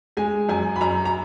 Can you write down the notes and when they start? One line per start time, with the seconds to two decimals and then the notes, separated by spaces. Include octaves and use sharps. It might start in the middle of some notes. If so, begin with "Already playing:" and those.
0.17 G#3 G#5
0.49 F#2 G#5
0.76 B5
0.81 F#2 A#5
1.05 A#5